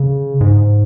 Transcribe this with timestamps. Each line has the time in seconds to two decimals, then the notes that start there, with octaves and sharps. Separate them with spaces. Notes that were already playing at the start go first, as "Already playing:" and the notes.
Already playing: C#3
0.41 G#2